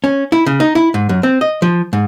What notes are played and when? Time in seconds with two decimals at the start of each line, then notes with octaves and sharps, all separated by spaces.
0.04 C#4
0.32 E4
0.46 C#3
0.60 D#4
0.75 E4
0.94 G#2
1.09 F#2
1.23 C4
1.41 D#5
1.62 F3
1.93 G#2